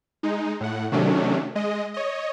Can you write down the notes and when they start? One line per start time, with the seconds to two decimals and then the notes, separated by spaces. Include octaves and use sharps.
0.23 G#3 D#4
0.61 A2 F#5
0.92 C3 D#3 F#3 A3 C#4 D4
1.55 G#3 D#5
1.94 C#5 D#5